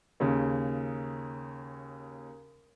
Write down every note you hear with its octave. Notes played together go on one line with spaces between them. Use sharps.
D#2 C#3